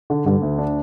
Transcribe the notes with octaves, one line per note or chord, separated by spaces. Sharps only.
D3
G2 D3
D2
D4